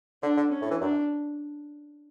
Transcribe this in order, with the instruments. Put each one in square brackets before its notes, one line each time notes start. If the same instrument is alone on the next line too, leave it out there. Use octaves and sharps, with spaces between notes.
[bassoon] D3 [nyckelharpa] D4
[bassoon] D3
[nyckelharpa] C#4
[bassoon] A2
E3
[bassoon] F#2 [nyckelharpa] D4